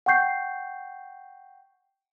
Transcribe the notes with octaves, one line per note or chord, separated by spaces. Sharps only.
F#5 G5 C#6 G6 C7